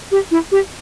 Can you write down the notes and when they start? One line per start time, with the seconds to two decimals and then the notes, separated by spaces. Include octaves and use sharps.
0.12 G4
0.31 E4
0.52 G4